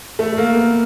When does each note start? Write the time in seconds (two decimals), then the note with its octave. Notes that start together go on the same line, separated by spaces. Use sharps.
0.19 A3
0.33 A3
0.37 A#3
0.55 B3